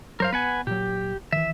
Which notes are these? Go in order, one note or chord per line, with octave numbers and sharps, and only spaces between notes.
G2 F#3 A#4 C5 F5
B3 B4 F#5 G#5
A#2 F#3 G4
D#3 E3 E5